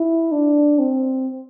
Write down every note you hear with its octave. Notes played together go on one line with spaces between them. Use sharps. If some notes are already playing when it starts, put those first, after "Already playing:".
Already playing: E4
D4
C4